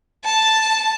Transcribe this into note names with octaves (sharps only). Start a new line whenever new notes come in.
A5